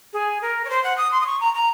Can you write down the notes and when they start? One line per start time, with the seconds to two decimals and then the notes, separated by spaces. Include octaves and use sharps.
0.13 G#4
0.42 A#4
0.65 C#5
0.70 C5
0.84 F#5
0.98 D#6
1.12 C6
1.21 D#6
1.26 C#6
1.41 A#5
1.55 A#5